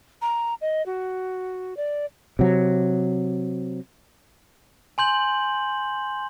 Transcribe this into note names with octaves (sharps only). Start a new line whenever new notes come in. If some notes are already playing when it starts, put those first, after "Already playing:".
A#5
D#5
F#4
D5
C3 F#3
G#5 C6 G6 F#7